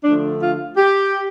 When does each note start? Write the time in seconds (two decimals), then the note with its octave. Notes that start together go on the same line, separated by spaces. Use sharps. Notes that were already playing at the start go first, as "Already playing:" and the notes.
0.04 D3 F3 A3 D4
0.40 F4
0.77 G4